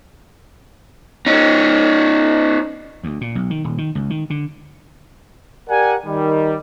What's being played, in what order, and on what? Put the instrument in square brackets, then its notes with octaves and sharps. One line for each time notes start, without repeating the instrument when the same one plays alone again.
[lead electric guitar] C#4 D#4
[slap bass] D2
A#2
B1
D#3
D#1
D#3
C#2
D#3
D3
[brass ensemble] G4 A#4 D5 F#5 G#5
D#3 G3